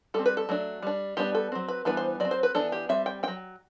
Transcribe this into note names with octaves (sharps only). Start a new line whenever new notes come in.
G3 C4 A4
B4
A4
F#3 A3 D4
G3 D4
G3 B3 D4 G4
A4
F#3 C4
B4
E3 G3 B3 D4 B4
C5
F#3 D5
C4
C5
B4
E3 B3 D4 A4
G4
G3 C4 E5
G5
F#3 C4 G5